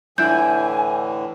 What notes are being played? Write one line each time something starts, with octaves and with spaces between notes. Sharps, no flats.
A2 D3 E3 D4 E4 G#5 G6